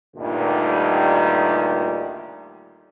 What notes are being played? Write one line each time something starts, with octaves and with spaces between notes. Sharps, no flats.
D2 G2 A#2 D#3 G3 D#4